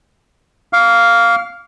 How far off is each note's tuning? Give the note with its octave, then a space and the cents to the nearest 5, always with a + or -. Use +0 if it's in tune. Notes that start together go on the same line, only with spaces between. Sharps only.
F5 +0 D6 -40